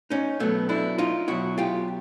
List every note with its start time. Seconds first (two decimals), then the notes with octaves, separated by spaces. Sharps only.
0.10 C#4 D#4
0.40 B2 F#3 A3 B3
0.69 D4 E4
0.98 D#4 F4
1.28 B2 F#3 E4 F#4
1.58 F4 G4